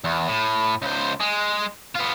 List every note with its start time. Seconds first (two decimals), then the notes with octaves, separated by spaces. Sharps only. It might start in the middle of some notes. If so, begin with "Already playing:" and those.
0.04 E2
0.28 A2
0.82 C#2 C5
1.20 G#3
1.95 B3 F4